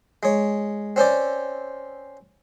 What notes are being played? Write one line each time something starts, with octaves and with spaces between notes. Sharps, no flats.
G#3 C#5
C4 C#4 C5 D5